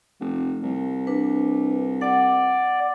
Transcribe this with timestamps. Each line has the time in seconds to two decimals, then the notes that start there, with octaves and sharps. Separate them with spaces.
0.20 F1
0.63 C2
1.07 D4 B4
2.01 D5 F#5 D6